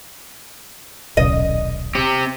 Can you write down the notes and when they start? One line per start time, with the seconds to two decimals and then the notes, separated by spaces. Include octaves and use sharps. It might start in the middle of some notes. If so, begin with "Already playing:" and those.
1.17 D#1 B1 C#3 D#5
1.95 C4 G4